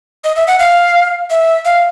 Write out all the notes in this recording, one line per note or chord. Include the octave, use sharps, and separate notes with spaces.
D#5
E5
F#5
F5
E5
F5